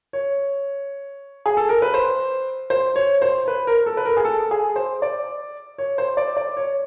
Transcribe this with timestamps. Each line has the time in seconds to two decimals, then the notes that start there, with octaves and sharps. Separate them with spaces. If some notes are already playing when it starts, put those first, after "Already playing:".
0.13 C#5
1.46 G#4
1.57 A4
1.69 A#4
1.82 B4
1.94 C5
2.70 C5
2.96 C#5
3.22 C5
3.48 B4
3.67 A#4
3.86 A4
3.97 B4
4.05 A#4
4.17 G#4
4.25 A4
4.51 G#4
4.76 C5
5.02 D5
5.78 C#5
5.98 C5
6.17 D5
6.37 D5
6.57 C#5